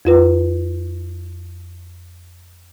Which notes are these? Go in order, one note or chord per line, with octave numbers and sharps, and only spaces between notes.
F2 F4 B4